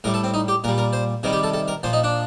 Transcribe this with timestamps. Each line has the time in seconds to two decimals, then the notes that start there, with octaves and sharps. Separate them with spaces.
0.04 A2 G3 A#4
0.14 A4
0.24 C4
0.34 D#4
0.48 G4
0.64 A#2 A#4
0.68 G3
0.78 A#4
0.93 C5
1.23 C3 D#3 G3 A#4
1.33 G4
1.43 A4
1.54 A4
1.68 A#4
1.83 A#2 F3 C5
1.93 D#4
2.04 D4